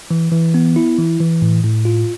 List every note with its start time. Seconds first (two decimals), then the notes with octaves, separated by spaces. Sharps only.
0.11 E3
0.32 E3
0.54 B3
0.76 E4
0.99 E3
1.20 E3
1.42 A2
1.64 A2
1.85 F4